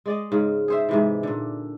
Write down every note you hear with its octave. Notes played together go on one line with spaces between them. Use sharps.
G#3 D5 D#5
G#2 C#3
G#4 C5 E5
G#2 C3 E3
A#2 D3